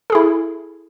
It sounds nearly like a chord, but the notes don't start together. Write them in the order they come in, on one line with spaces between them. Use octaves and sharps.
A4 G#4 E4